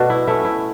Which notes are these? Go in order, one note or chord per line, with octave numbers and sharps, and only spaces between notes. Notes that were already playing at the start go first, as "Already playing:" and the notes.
Already playing: B2 A3 D4 F#4
E4
A3 C#4 E4
E4